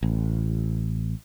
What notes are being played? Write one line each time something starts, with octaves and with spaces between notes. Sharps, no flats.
A1